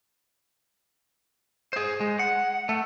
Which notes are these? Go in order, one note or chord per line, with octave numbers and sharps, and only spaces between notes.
G#4 C5
G#3
F#5
A3